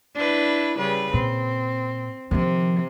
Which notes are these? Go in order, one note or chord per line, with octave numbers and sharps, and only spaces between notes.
D4 E4 B4
C#3 G3 B4
A#2 C4
C3 D#3 F3